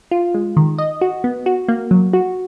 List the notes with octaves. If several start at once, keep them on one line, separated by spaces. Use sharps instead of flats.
F4
G#3
D#3
D#5
F#4
B3
F#4
A#3
F#3
F#4